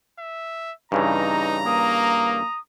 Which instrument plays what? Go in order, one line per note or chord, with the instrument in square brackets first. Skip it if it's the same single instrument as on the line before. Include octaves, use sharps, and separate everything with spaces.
[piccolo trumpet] E5
[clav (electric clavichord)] G2 C#3 E3 [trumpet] D#4 [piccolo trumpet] A#5
[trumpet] A#3 [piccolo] D#6